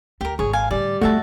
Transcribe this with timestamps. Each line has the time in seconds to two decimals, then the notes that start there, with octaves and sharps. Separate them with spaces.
0.21 D2 G4 A#4
0.39 G#1 G#4 C#5
0.53 F5 G#5
0.71 A2 D3 G3 D5
1.01 F2 F3 A3 F#4 E5 A5